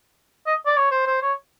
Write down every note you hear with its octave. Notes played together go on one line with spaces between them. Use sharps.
D#5
D5
C#5
C5
C5
C#5